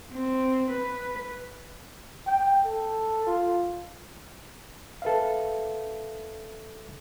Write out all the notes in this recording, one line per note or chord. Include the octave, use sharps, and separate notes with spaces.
C4
B4
G5
A4
F4
A4 B4 E5 F5